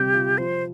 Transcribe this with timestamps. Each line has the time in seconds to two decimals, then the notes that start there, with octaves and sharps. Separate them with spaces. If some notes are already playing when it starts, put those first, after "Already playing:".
Already playing: C3 G3 C4 G4
0.13 F4
0.38 F3 C5